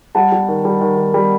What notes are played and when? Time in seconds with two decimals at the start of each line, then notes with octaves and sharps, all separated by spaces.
0.15 G3 F#5 A5
0.32 G3
0.48 D#3
0.65 G3
0.81 D#3
0.97 D#3
1.14 G3